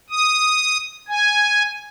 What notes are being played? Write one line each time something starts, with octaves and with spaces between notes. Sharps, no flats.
D#6
G#5